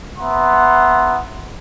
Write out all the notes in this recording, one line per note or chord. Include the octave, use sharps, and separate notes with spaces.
B3 E5 F#5 A#5 C6